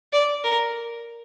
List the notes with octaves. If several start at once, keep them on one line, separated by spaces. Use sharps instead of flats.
D5
A#4